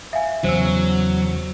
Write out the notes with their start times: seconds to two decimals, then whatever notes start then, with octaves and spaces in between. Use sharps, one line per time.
0.13 E5 F5 G#5
0.44 E2 C#3 F#3 C5 E6